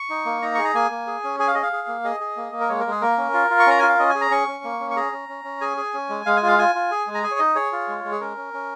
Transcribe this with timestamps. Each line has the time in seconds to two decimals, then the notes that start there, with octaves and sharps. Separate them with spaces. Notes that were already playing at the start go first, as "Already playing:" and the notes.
Already playing: C#6
0.10 D#4
0.26 A#3
0.42 D#4 A#5
0.55 G#4 C#6
0.65 A#5
0.74 A#3 G#5
0.91 A#3
1.07 G#4
1.24 C#4
1.39 G#4 G#5
1.48 F5
1.55 G#4 D#5
1.63 F5
1.73 G#4
1.88 A#3
2.04 G#4 D#5
2.20 G#4
2.37 A#3
2.52 A#3
2.60 A#4
2.69 G#3 C#5
2.80 A#4
2.86 G#3
2.91 G#4
3.01 A#3 A#4
3.18 C#4
3.33 F4
3.50 F4
3.60 C#6
3.67 C#4 A#5
3.79 F4 G#5
3.89 F5
3.99 C#4 D#5
4.10 G#5
4.15 G#4
4.21 A#5
4.31 C#4 C#6
4.48 C#4
4.64 A#3
4.80 C#4
4.91 C#6
4.96 G#4 A#5
5.12 C#4
5.29 C#4
5.44 C#4
5.61 G#4 G#5
5.77 G#4
5.94 C#4
6.09 G#3
6.26 G#3 F5
6.37 G#5
6.43 F4
6.48 F5
6.58 F4 G#5
6.75 F4
6.91 G#4
7.07 G#3
7.15 A#5
7.23 G#4 G#5
7.31 C#5
7.39 D#4 D#5
7.55 G#4 C#5
7.72 F4
7.88 G#3
8.04 G#3
8.12 G#4
8.21 C#4 A#4
8.37 C#4
8.54 C#4